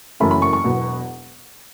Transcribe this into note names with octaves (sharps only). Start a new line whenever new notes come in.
F#1 F#2 E3 A3 C#4 B5
B5
C#6
C#6
E1 E2 B2 F#3 B3